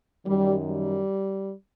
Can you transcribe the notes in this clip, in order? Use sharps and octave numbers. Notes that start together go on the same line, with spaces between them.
F#2 D#3 G3
G3